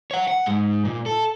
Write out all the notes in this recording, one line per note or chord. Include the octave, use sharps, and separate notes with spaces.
C#5 F#5
F#5
G#2
A#2
A4